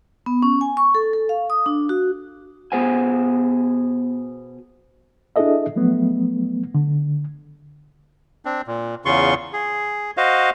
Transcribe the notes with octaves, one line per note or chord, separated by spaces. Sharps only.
B3
C#4
G#5
C#6
A4
A4
F5
D#6
D4
F#4
B2 B3 G#4 C5 F#5 G#5
D4 E4 G#4 A4 D#5 E5
F3 F#3 A3 B3
D3
C4 D4
A#2
E2 C#3 F4 C6 C#6
G#4
F#4 C5 D#5 F5